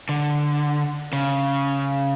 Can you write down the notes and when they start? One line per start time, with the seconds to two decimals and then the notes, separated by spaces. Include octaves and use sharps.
0.09 D3
1.13 C#3